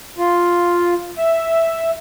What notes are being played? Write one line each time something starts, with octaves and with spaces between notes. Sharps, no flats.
F4
E5